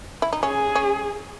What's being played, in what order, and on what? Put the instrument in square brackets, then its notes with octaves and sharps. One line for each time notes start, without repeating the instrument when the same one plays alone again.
[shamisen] E4
D#4
[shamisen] C#4 [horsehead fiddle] G#4
[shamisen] C#4